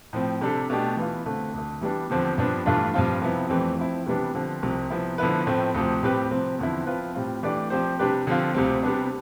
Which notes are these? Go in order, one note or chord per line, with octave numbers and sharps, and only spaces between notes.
A2 F3 C4
C3 G3 D4 A4
B2 A3 D4 G4
E3 B3 F4
D3 A3 C4
D2 D3 A3
E3 G3 B3 D4
E2 D3 F3 C4 G4
G2 F3 B3 D4
G2 E3 A3 D4 F4
G2 F3 C4 F4
C3 F3 B3 E4
F2 E3 A3 C4 G4
F3 C4 E4
C3 E3 G3 B3 D4
D3 F3 C4
C2 C3 F3
C3 F3 B3 E4
D3 F3 B3 E4 B4
A2 F3 A3 C4
D2 C3 F3
A2 G3 C4 G4 B4
C3 F3 C4
E2 D3 F3 C4 E4
F3 C4 F4 B4
A2 G3 C4 F4
E3 A3 D4 G4 D5
F3 C4 G4 C5
C3 G3 D4 G4 B4
D3 F3 C4 F4
D2 C3 G3 C4
C3 G3 B3 D4